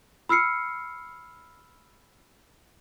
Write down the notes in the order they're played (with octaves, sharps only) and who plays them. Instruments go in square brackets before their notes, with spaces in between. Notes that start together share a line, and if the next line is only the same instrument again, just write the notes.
[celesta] B5 E6 F6 C7 C#7